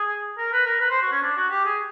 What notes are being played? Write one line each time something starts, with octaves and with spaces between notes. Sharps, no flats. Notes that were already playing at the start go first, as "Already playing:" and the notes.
Already playing: G#4
A#4
B4
A#4
B4
C5
F#4
C#4
D4
F#4
G4
G#4